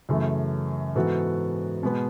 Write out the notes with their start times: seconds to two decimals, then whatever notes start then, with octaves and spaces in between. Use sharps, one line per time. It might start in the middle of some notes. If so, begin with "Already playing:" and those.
0.09 F#2 C#3 E3 A3
0.95 G#2 E3 B3 F#4 A4
1.83 B2 G#3 B3